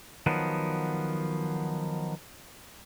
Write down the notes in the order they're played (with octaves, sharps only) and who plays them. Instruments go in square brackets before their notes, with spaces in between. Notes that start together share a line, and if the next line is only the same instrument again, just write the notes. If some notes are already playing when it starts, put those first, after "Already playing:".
[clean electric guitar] D#3 F3 F#3 B3